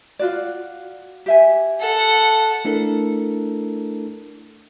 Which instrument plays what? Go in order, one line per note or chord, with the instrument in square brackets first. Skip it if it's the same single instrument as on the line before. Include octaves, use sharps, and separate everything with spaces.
[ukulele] F4 F#4 D5
G4 E5 G#5
[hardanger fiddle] A4 F#5
[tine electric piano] A3 D4 E4 A4 A#4